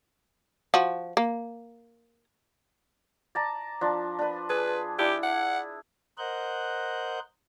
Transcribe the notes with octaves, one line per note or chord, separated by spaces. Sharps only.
F3 F#4
A#3
D5 A5 A#5
F3 D4
D4 B4
G#4 B4
D4 E4 G4
F#5
A#4 C5 D#5 F#5 F#6 G6